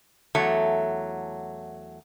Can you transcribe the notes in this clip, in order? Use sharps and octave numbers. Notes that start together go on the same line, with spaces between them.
E2 F#3 A3